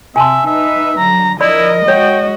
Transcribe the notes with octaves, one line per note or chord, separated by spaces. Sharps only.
C3 E5 G#5 A5 C6
D#4 B4 E5
D3 F#3 G3 A#5
F3 E4 A#4 D5 D#5 B5
G#3 F#4 C#5 G5